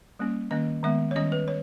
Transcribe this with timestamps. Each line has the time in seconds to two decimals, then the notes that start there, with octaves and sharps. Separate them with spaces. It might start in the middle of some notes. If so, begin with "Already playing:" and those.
0.19 G3 A#3 C#4
0.51 D#3 A#3 C#4 D#5
0.83 D#3 G#3 B3 E5
1.11 C#5
1.16 D#3 G3 C#4 D#5
1.32 B4
1.48 C#5